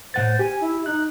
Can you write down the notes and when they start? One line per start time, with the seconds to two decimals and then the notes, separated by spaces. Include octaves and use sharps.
0.14 A2 C5 F#5 A6
0.39 G4 G#5
0.61 E4
0.86 D#4 F#6